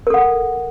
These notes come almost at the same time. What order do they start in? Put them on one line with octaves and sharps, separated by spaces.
A#4 A4 F#5